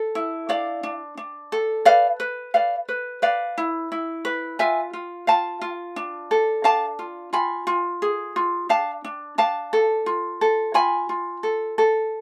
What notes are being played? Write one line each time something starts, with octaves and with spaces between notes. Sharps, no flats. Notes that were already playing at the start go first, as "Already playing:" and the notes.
Already playing: A4
E4
D4 D5 F5
D4
D4
A4
B4 D5 F5
B4
B4 D5 F5
B4
B4 D5 F5
E4
E4
B4
F4 E5 G#5
F4
F4 F5 A5
F4
D4
A4
D4 F5 A5
F4
F4 G#5 B5
F4
G#4
F4
D4 F5 A5
D4
D4 F5 A5
A4
F4
A4
F4 G#5 B5
F4
A4
A4